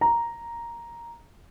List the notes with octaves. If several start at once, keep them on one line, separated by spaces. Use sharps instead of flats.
A#5